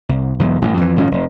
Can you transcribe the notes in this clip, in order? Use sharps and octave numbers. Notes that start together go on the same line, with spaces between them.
C2
B1 E2 G#2
A1 G2
F2 C3 E3
G#1 F2 A2 C#4
F1